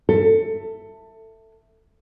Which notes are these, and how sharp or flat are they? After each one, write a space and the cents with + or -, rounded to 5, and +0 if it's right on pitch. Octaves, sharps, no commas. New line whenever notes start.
A4 +20 E5 +0